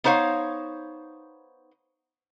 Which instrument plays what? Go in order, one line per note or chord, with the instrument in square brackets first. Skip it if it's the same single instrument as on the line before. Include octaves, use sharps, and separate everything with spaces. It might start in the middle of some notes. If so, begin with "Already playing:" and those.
[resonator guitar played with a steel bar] B3 D#4 C5 C#5 F5